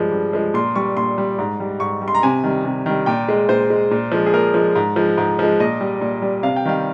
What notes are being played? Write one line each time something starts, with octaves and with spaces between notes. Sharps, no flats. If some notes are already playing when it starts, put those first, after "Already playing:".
Already playing: G2 F3 G#3
G2
F3 G#3
A#2 C6
G3 C#6
A#2 C6
G3
G#2
G3
G#2 C#6
G3
C6
A#5
C3 G#5
D#3 G3
C3
D#3 G3
A#2 G5
G#3
A#2 C5
G#3
A#2
F3 G#3
G#4
A#2 A#4
F3 G#3
G#2
F3 G#3
G#2
F3 G#3
A#2 D#5
G3
A#2
G3
C3 F5
G5
D#3 G3 F5